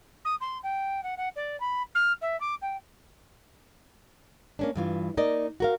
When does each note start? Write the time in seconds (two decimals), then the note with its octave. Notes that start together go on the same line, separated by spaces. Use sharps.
0.25 D#6
0.41 C6
0.63 G5
1.03 F#5
1.18 F#5
1.36 D5
1.60 B5
1.95 F6
2.22 E5
2.41 D6
2.62 G5
4.59 A#3 C#4 D4
4.76 G2 E3 F4
5.17 A#3 D#4 A#4 D5 D#5
5.60 F#4 A#4 F5